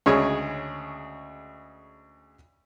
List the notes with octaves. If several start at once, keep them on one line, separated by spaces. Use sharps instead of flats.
D2 C#3 G#3 G#4 C#5 G#5